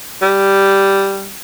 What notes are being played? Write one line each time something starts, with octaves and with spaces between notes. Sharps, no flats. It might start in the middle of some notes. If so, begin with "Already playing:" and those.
G3